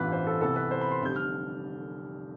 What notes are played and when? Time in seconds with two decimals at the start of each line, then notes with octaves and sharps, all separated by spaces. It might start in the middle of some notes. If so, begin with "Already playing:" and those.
Already playing: A1 G2 E3 B3 F4 B4
0.12 C5
0.27 A4
0.41 C2 C3 E3 B3 E4 A4
0.56 B4
0.71 C5
0.81 B5
0.91 C6
1.01 F1 F2 D3 G3 G6
1.16 F6